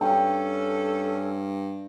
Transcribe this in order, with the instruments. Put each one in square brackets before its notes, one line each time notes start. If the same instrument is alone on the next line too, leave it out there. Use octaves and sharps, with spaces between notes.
[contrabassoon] G2 [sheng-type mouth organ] C#4 [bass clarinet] A4 [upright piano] G5